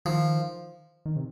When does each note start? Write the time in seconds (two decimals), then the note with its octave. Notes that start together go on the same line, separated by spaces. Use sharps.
0.05 D#3 F3
1.06 D#3
1.16 C3